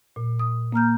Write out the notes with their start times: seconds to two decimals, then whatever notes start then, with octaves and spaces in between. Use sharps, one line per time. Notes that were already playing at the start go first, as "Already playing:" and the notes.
0.16 A#2
0.39 D#6
0.72 A#3 A#5 F6 G6